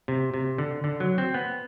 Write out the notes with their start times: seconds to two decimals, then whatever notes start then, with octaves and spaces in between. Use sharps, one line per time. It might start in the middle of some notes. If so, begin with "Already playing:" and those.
0.08 C3
0.34 C3
0.58 D3
0.84 D3
1.00 F#3
1.18 C4
1.34 B3